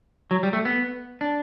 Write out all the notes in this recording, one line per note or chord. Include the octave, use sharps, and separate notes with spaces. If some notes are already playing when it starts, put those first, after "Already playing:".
F#3
G3
A3
B3
D4